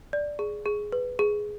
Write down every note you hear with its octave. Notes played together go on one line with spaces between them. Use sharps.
D5
G#4
G#4
B4
G#4